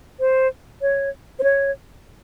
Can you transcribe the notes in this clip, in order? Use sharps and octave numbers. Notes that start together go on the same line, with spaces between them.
C5
C#5
C5
C#5